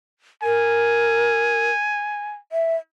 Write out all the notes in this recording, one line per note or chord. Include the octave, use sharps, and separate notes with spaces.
A#4 G#5
E5